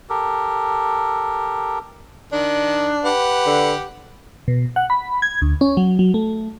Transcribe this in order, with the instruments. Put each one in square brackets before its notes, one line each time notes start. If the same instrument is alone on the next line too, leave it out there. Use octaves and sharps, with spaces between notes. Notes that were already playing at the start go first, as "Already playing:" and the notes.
[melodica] G4 A4 A#4
[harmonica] D#3 [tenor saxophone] D4
[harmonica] G4 F#5 [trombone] B4
[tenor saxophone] D3
[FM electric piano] B2
F#5
B5
G#6
D2
C#4
F#3
F#3
A3